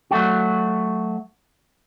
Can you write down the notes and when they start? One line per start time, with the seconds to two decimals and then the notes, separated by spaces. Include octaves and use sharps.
0.11 F#3 A3 F#4